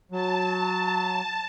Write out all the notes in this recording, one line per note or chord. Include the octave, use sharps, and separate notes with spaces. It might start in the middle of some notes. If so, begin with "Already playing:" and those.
F#3 A5